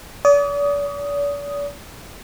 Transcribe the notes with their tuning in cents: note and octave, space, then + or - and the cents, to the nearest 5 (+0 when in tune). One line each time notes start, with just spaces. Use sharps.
D5 -40 D#6 +0